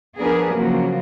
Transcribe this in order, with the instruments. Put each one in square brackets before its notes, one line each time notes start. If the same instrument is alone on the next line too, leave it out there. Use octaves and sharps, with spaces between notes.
[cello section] F3 B3 D4 G#4 A#4 B4
C#3 F3 F#3 A#3